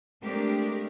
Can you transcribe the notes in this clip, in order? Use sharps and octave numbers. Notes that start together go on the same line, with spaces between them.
G#3 A3 C4 D4 G4 A#4